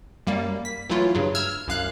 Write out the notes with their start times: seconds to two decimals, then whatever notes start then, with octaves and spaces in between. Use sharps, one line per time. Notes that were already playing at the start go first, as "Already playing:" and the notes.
0.27 F#2 G3 A#3
0.65 B6
0.89 E3 F#3 A3 E4 F4
1.15 G2 C#3 F#3
1.35 E6 F6 G#6
1.67 C2 F#2 F5 F#6